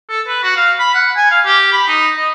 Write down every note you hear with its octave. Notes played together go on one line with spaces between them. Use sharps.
A4
B4
F#4
F5
B5
F#5
G#5
F5
G4
B5
D#4
D#5